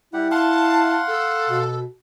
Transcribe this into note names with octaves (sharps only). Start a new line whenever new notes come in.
G3 E4 G4 F#5
F5 F#5 A5 C6
A4
B2